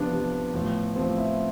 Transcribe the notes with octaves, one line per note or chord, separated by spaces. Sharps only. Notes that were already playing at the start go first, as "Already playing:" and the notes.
Already playing: C3 F3 B3 D4
C3 F3
A2 F3
A2 F3 C4
E4